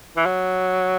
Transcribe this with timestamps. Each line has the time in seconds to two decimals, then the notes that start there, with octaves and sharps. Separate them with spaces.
0.16 E3
0.26 F#3